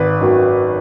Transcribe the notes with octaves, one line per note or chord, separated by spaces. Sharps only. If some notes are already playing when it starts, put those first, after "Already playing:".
Already playing: G#1 B4
F#2 D#3 F#3